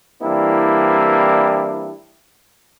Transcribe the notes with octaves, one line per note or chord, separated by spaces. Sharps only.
E3 G3 A#3 C4 D4 E4